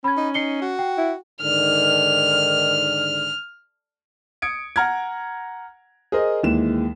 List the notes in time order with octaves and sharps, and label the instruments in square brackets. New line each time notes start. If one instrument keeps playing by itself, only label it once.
[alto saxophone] C#4 [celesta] B5 G#6
[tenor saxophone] D#4
[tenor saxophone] D#4 [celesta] C7 C#7 G7
[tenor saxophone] F#4
[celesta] G5
[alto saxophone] E4
[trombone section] G#2 D3 D#3 [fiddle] F6
[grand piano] D#6 G#6 C#7 D7
F#5 A#5 F6 G#6
G#4 A#4 C5 D#5
D#2 E3 G#3 E7